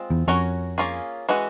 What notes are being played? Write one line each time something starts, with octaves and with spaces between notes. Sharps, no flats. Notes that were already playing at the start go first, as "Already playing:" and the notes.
Already playing: G#3 C4 F4
E2
F2 C#4 F#4 A#4 C#5
A#3 C#4 F4 G#4
E3 G#3 C#4 F#4